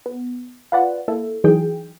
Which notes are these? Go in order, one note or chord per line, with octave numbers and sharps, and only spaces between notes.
B3
F4 B4 D5 F#5
A#3 E4 A4
E3 F#3 D#4 G#4 G5